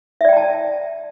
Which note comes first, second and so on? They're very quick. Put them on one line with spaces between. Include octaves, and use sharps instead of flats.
E5 D5 G5 A#5 A5